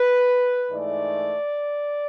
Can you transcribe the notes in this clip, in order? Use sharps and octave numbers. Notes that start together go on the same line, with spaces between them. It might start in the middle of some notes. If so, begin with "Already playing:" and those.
Already playing: B4
G#2 E3 A3 D5